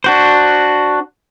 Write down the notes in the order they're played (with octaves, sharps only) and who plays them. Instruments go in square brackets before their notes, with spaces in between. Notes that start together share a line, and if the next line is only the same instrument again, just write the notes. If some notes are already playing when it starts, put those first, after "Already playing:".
[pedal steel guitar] D4 F#4 C5